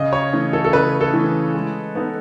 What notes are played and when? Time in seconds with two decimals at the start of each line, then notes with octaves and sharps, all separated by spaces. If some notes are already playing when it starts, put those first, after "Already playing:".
Already playing: C#3 D#5
0.13 C#5
0.33 E3 A3 C#4
0.53 A4
0.65 A4
0.73 C#3 B4
1.01 A4
1.14 E3 A3 C#4
1.55 G#3
1.95 B3 D#4 A4